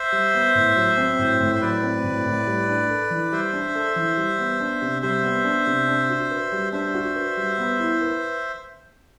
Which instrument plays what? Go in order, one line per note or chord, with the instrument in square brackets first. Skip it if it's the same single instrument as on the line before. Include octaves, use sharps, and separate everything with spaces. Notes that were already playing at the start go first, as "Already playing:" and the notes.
Already playing: [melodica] C5 E5
[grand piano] G3
B3
A2
F#3
C4
A2
A2
[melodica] C5
[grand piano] F#3 [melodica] B4 D5
[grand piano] C4
A2
A2
G3
D4
A4
E3
[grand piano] G3 [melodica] C5 E5
[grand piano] D4
A4
E3
G3
B3
D4
C3
[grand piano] G3 [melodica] C5 E5
[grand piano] B3
D4
C3
D4
F#4
B4
G3
[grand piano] D4 [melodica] C5 E5
[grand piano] F#4
B4
G3
B3
E4
B4